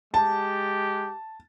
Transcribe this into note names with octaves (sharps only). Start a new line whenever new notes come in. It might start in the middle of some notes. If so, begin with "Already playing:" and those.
G#3 G4 A5